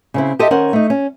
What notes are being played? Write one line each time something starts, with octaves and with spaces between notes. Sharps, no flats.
C#3 C4 E4
G4 A4 C5 D#5 E5
D#3 C#4 A#4 C5 F#5
A3 D#4
C#4